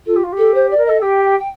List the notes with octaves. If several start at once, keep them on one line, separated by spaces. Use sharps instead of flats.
F4 A4
G4
F4
G4
A4
C5
D5
A#4
A4 D#5
G4 G5
G5
G5